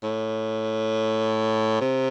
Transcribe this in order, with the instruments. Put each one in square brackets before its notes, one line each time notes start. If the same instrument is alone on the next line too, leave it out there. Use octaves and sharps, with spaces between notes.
[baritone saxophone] A2
C3